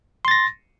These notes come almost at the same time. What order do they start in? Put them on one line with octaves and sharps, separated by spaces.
C6 A6 A#6